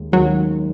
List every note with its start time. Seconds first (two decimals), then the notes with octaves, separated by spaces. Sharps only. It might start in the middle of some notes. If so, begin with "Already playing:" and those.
Already playing: D#2 D#3 G#3
0.12 D#2 D#3 F#3 G#3